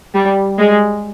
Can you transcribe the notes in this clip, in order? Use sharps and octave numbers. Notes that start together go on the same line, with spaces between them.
G3
G#3